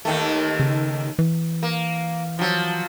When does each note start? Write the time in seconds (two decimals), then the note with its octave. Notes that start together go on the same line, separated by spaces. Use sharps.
0.05 D#2 D#3 A3
0.60 C#3
1.19 E3
1.63 A#3
2.39 F3 F#3